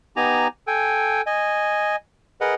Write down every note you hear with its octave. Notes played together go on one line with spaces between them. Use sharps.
B3 D#4 G4 G#5 A#5
A4 G5 G#5
D#5 G#5
G#4 A#4 B4 D#5 F#5